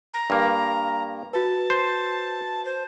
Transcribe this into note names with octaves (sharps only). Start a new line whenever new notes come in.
A#5
G2 A#3
F#4 B4 A5
C5
C5